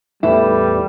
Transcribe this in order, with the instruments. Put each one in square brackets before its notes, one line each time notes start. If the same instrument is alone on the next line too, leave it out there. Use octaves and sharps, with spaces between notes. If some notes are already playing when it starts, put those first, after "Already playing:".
[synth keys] E2 A2 E3 [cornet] G3 [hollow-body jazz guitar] E4 [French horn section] A4 B4